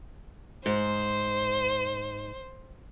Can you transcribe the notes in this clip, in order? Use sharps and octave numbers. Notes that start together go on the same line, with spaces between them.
G#2 C5